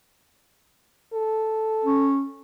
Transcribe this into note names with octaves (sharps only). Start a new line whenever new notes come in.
A4
C#4